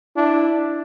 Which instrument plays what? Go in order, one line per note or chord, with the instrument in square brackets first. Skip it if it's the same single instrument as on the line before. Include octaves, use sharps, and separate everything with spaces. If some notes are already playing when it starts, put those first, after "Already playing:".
[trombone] D4 [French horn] E4